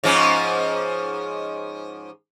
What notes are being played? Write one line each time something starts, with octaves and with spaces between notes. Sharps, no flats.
G#2 F3 C#4